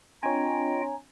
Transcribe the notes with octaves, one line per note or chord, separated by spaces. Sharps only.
C4 D4 F4 C#5 D#5 G5 G#5 A#5